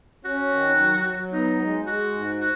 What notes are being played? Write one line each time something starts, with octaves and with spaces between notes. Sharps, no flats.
C#4 F#4
D#3
F#3
F#3
B3 D#4
G#3
G#3 F#4
G#2
F#4